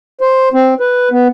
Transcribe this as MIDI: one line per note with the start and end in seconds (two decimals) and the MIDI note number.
0.21 0.49 72
0.54 0.74 60
0.80 1.09 71
1.11 1.28 59